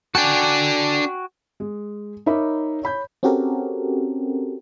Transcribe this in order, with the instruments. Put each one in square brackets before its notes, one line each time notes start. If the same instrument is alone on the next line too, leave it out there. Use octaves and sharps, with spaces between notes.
[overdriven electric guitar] D4 A4 [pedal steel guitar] F#4 G5 G#5
[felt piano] G#3
D#4 A#4 C#5 E5 B5 D6
C#5 B5 G6
[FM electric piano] C4 C#4 F#4 G4 A4 A#4